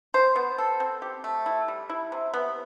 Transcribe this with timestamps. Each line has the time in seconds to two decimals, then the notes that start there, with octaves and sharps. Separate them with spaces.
0.14 C5
0.36 B3
0.58 A4
0.80 C4
1.02 G4
1.24 A3
1.46 E4
1.68 G3
1.90 E4
2.12 C3
2.34 B3